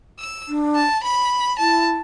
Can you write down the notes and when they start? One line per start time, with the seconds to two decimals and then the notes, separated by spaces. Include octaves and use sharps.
0.20 E6
0.48 D4
0.76 A5
1.04 B5
1.59 E4 A5